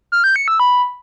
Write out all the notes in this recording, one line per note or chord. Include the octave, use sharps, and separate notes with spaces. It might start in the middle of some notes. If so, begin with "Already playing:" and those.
F6
G6
C#7
E6
B5